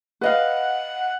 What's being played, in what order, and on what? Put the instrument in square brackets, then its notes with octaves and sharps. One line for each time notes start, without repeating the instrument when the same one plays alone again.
[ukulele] B4 D#5 F5 [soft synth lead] F#5